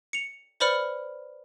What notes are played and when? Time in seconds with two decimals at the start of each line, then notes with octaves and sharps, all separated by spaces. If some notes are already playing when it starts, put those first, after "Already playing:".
0.13 C#7 F7
0.60 B4 C5 D5 B5 F6 C#7